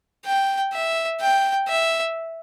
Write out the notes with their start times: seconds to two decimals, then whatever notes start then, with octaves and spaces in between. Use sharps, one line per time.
0.26 G5
0.73 E5
1.21 G5
1.68 E5